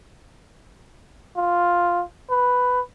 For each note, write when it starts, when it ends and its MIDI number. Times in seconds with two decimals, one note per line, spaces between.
1.37 2.01 65
2.30 2.80 71